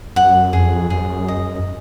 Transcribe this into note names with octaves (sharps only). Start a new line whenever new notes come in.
F#2 F#5
F2 G#4
F#2 G#4
D#5